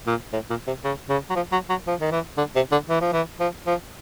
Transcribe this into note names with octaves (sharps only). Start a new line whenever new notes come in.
A#2
A2
A#2
C3
C#3
C#3
F#3
F3
F#3
F#3
F3
D#3
E3
D3
C3
D3
E3
F3
E3
F3
F3